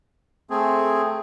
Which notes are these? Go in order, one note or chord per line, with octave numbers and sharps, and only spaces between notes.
A3 C4 G#4